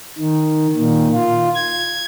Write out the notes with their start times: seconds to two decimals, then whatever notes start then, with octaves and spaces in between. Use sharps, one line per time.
0.18 D#3
0.76 A#2 D#3
1.14 F4
1.55 G#6